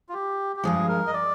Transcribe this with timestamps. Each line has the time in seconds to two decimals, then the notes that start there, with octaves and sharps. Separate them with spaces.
0.09 F4
0.13 G4
0.56 G4
0.63 G2 F3 G#3 G#4
0.89 A#4
1.07 D#5
1.14 D5